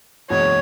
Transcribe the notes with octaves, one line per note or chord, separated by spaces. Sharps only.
F#1 E2 B2 G#3 C#5